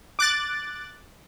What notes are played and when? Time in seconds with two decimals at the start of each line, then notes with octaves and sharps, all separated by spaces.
0.19 D6 F#6 A6